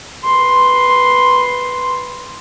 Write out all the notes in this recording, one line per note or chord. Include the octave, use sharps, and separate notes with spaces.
B4 C6